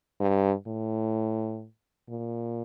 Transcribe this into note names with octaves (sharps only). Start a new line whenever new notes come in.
G2
A2
A#2